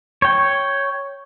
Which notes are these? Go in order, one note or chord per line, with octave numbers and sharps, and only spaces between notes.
C#5 G5